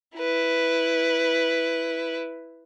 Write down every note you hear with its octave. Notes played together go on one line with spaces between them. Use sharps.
E4 B4